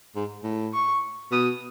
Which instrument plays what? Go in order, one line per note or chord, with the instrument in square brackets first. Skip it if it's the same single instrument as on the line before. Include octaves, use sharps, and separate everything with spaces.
[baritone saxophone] G#2
A2
[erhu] C#6
[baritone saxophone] B2 [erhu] D#6